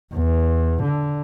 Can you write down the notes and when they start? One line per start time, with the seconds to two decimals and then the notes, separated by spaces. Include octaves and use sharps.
0.14 E2
0.82 D3